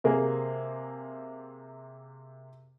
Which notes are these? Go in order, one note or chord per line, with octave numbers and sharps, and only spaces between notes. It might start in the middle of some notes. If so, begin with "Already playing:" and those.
C3 A#3 G#4